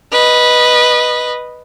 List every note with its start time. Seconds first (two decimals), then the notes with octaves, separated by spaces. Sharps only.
0.12 B4 D#5